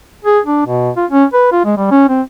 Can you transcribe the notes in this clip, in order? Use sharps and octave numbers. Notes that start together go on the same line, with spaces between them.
G#4
D4
B2
F4
C#4
B4
F4
G#3
G3
C#4
C4